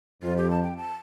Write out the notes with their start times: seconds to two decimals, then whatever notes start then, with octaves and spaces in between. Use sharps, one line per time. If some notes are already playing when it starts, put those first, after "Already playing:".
0.23 F2 F4
0.37 G4
0.50 A5
0.63 G5
0.77 A5